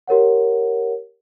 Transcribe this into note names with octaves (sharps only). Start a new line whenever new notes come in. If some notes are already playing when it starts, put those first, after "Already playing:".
G4 A#4 C#5 F#5